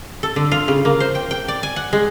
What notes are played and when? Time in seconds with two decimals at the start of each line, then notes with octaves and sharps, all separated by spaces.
0.23 A4
0.36 D3
0.52 F4
0.68 C#3
0.85 A#3
1.00 C5
1.15 G5
1.31 G5
1.48 D5
1.63 G#5
1.76 F#5
1.93 G#3